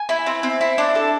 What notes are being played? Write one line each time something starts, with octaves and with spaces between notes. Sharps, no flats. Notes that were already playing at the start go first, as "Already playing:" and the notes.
Already playing: G#5
E4
C4
C4
E4
D4
A4